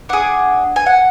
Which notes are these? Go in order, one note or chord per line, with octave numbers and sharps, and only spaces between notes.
D4 G#4 F#5
G#5
F#5